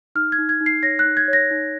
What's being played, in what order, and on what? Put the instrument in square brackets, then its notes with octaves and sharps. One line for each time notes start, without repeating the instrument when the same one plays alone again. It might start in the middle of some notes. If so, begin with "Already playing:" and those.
[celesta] D#4 F6
G#6
D#4
G#6
D#4
C7
C#5 A#6
F#6
D#4
G#6
C#5
A#6
D#4